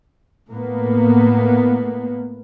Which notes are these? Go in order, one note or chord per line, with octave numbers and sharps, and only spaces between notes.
A2 A#3 B3